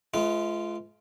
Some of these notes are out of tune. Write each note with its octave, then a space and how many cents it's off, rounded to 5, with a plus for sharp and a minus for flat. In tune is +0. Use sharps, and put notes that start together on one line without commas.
G#3 +45 B3 +20 F4 -15